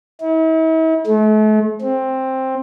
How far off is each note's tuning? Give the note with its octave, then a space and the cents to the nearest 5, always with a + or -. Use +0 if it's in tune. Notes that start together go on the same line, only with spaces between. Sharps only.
E4 -45
A3 -40
C4 +10